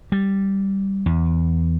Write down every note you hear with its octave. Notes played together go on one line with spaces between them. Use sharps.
G3
E2